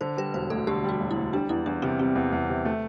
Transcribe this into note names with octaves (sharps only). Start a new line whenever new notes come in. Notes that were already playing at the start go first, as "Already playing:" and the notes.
D3 C5
G3 B4
E1 C5
D2 A4
D3 G4
G3 F#4
E1
E4
D2
G3 D4
E2 E4
E2 D4
C3 C4
G3 C4
E2
E2
C3
A3